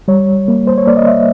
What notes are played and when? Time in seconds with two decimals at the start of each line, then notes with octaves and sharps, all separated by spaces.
0.08 G3 C#5
0.48 A#3
0.67 C5
0.78 C#5
0.87 A#3 D5
0.97 D#5
1.07 E5